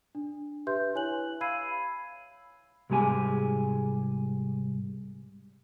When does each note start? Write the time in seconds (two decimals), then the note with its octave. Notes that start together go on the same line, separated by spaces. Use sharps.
0.15 D4
0.67 G4 B4 E5 C6 G6
0.94 E4 C#5 G#5 F#6 F#7
1.41 F5 B5 E6 G#6 C7 D#7
2.90 C2 G#2 G#3 G4 G#5